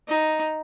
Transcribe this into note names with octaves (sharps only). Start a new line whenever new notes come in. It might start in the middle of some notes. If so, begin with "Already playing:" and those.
D#4